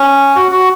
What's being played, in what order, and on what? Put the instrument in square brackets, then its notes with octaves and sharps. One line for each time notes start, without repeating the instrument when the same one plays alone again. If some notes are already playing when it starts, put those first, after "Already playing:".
Already playing: [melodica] C#4
F#4
F#4